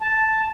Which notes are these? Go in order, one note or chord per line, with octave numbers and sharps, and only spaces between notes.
A5